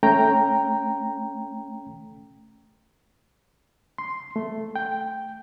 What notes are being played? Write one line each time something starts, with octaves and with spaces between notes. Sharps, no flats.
A3 C#4 G5 A#5
C6
A3
G5